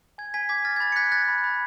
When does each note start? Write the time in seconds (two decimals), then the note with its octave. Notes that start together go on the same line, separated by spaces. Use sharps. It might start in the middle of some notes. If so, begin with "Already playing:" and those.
0.18 G#5 G#6
0.34 G#5 G#6 B6
0.49 D6 G#6 B6
0.65 F6 A6
0.76 G#6
0.80 B5 A6
0.92 C#7
0.96 F#6 G#6 B6
1.12 F#6 A6
1.28 B5
1.44 B5